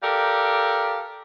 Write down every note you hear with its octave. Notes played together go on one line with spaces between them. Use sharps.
G4 A4 A#4 D5 F5